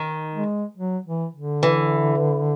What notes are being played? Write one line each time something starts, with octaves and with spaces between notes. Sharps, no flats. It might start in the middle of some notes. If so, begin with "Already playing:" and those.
Already playing: D#3
G#3
F#3
E3
D3
E3